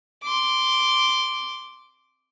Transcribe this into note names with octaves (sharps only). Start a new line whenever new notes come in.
C6 D6